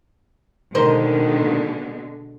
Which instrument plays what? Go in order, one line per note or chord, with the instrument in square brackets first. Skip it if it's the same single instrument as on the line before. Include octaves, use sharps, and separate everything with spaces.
[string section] B2 D3 G#3 [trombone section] D#3 [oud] A#4 C5